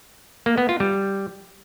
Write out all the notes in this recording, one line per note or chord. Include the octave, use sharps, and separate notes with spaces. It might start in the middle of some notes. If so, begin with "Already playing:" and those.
A#3
B3
F4
G3